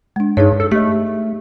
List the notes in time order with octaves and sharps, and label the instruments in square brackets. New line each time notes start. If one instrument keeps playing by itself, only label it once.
[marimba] G#3 D4
[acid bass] G2 [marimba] D#4 G#4 C#5
[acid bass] A4
[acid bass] A3 [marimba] G4 D#5